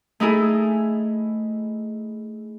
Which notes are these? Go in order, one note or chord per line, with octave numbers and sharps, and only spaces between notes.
A3 D#4 E4 G#4 A4